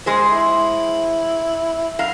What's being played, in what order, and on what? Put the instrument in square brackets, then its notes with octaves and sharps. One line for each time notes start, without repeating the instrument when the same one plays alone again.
[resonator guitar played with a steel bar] G#3 G#4 C5
[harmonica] E4
[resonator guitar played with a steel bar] F#3 F5